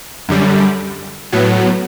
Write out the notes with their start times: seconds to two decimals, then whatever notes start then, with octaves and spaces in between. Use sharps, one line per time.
0.28 F#2 D3 G3
1.32 A2 F#3 B3